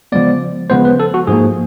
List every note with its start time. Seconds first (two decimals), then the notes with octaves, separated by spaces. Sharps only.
0.12 C#3 F3 G#3 B3 D5
0.70 C#3 F3 G#3 B3 C5
0.85 B4
1.00 A4
1.14 F#4
1.27 G#2 F3 A#3 G#4